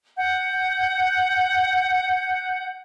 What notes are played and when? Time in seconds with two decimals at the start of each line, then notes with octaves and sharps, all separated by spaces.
0.16 F#5 G6